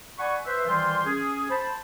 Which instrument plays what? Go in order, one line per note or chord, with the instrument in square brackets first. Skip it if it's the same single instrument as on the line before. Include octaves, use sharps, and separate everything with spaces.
[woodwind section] D5 F#5 G#5 B5 C#6
B4 C5 E5
D#3 E3 G3 F4 C5 C6
C#4 G#4
C5 A5 B5